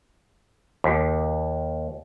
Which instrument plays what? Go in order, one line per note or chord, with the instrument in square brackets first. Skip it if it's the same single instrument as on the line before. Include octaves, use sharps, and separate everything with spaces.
[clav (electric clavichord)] D#2